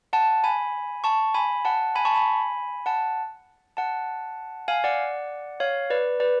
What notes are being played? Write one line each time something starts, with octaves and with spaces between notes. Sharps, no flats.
F#5 A5
G#5 B5
A5 C#6
G#5 B5
F#5 A5
G#5 B5
A5 C#6
G#5 B5
F#5 A5
F#5 A5
F5 G#5
D5 F#5
C#5 F5
B4 D5
B4 D5